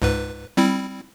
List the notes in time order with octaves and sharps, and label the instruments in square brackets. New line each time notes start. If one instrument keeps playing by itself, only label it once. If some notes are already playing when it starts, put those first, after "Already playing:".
[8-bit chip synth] C#2 G#2 B4
G3 C4 E4